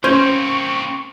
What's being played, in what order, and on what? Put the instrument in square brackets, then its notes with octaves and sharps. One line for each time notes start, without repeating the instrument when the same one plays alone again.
[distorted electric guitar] A#3 C4 [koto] C#4 G#5 [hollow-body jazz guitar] C5 [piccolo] C#6